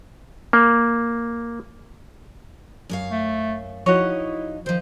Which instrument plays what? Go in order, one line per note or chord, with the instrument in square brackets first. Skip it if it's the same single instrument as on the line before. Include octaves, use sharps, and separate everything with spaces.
[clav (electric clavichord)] A#3
[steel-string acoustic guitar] F#2 C#5 F5
[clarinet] A3
[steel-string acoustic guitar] F3 D#4 D#5 [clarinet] E4 [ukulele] F#4 C#5
[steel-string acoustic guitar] D#3 F3 [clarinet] C5